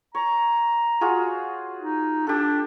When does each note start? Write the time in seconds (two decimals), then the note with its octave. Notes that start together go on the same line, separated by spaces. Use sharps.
0.15 C#5 A#5
1.01 F4 F#4 G#4
1.81 D#4
2.27 D4 G4 A4